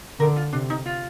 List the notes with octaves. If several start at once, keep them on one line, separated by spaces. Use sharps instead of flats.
D3 A#4
F4
C3 D4
D#4
F4